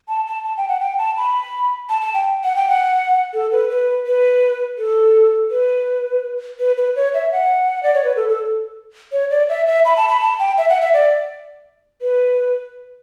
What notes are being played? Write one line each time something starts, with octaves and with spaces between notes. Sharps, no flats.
A5
A5
A5
G5
F#5
G5
A5
B5
A5
A5
G5
F#5
G5
F#5
A4
B4
B4
B4
A4
B4
B4
B4
C#5
E5
F#5
D5
C#5
B4
A4
A4
C#5
D5
E5
E5
B5
A5
B5
A5
G5
E5
F#5
E5
D5
B4